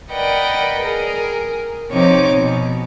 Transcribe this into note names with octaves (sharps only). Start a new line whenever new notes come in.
A#4 B4 D5 D#5 F#5 G5
G#4 A#4
C3 F3 C4 D#4 C#5 D6
B2